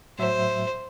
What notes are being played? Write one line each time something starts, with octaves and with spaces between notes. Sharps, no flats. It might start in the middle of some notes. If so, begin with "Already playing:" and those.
A2 F#3 C5 E5